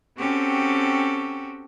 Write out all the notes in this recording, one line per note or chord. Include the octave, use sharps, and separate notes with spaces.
C4 C#4 F#4 G4 A4